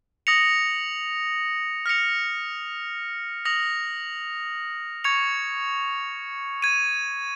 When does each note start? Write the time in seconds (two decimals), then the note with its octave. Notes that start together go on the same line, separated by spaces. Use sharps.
0.27 D#6 A#6 C#7 F7
1.86 F6 A#6 C#7 F7
3.45 D#6 A#6 F7
5.04 C#6 G#6 C#7 F7
6.62 G#6 D#7